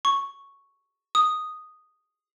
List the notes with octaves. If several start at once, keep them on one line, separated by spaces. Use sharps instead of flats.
C#6
D#6